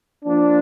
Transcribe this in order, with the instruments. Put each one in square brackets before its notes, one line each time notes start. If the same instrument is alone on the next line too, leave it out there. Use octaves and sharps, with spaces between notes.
[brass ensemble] F3 A#3 D4